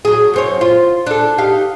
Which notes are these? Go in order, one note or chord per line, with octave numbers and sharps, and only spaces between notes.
F#3 G#4
F#2 C4 C#5
F4
D4 A4
D#4 G4 F5